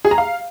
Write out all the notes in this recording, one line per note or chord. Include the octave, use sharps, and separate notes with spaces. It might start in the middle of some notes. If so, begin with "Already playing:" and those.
G#4
A#5
F5